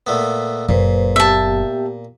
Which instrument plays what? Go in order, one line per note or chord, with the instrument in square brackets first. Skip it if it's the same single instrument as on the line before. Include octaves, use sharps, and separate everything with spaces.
[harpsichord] A#2 A3 B3
[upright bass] F#1 [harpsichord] A#2 [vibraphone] G#4 B4 C5
[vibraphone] B3 G4 G5 [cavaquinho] E5 A5